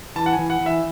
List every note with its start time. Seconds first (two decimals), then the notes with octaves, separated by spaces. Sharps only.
0.16 E3 A5
0.26 F#5
0.33 G#5
0.39 E3
0.50 F#5
0.61 E3
0.66 E5